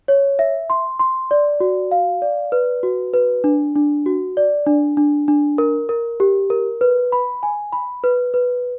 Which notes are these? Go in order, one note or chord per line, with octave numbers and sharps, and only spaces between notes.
C#5
E5
C6
C6
D5
F#4
F5
D5
B4
F#4
B4
D4
D4
F#4
D5
D4
D4
D4
A#4
A#4
G4
A#4
B4
B5
G#5
B5
B4
B4